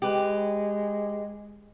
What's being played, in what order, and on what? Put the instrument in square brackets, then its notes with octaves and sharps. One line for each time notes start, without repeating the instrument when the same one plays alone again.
[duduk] G#3 [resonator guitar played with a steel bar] G4 B4